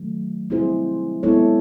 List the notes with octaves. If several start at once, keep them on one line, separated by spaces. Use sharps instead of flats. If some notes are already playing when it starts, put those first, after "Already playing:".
Already playing: D#3 F#3 A3
G3 C4 E4 G#4 C5
G#3 B3 E4 A4 C#5